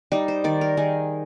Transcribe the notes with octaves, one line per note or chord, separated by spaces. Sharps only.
G3 D#4
C5
D#3 D5
A#4
D#3 G#4